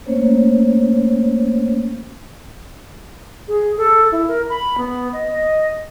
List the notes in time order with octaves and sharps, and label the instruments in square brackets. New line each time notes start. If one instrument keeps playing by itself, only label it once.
[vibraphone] A3 A#3 C#4 C5 C#5
[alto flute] G#4
A4
E4
A#4
B5
B3
D#5
D#5